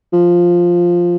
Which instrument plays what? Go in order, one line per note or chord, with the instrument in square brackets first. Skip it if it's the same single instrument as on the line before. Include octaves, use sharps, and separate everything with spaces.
[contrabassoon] F3